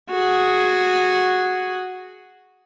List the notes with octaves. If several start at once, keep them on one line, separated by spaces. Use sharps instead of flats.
F#4 G#4